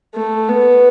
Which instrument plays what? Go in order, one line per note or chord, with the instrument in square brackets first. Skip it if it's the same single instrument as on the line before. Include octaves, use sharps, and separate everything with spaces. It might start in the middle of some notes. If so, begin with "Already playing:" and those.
[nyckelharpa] A3
B3